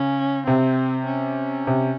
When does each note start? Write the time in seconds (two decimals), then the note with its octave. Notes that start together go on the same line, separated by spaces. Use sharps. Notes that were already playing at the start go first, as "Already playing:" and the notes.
Already playing: C#3 C#4
0.47 C3 C4
1.06 C#4
1.67 C3